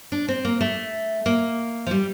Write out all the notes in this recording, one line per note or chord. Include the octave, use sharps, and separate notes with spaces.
D4
C4
A#3
A3
A#3
F3
G3